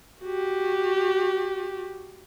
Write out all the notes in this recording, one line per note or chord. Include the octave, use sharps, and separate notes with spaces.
F#4 G4